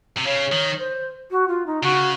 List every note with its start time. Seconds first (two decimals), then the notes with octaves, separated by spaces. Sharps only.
0.17 C3
0.25 C#3 C#5
0.52 D#3
0.79 C5
1.31 F#4
1.48 F4
1.66 D#4
1.83 C#3 F#4